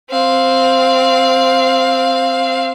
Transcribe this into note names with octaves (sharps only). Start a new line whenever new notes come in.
C4 F5